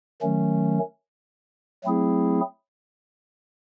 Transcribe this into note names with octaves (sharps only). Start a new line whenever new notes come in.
D#3 F#3 A3 C#4
F#3 A3 C4 E4 G#4